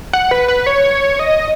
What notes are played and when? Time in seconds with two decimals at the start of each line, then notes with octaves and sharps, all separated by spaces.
0.13 F#5
0.31 B4
0.48 B4
0.66 C#5
1.19 D#5